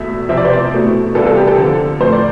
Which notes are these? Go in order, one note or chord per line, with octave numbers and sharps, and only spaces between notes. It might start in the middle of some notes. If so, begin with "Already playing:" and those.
Already playing: E2 B2 A3 E5
C3 F3 C4 E5
D5
C5
D5
B2 A3 E4
E2 C3 G3 D4 F4 A4
A4
G4
A4
D3 F3 C4
A2 F3 C4 C5
D5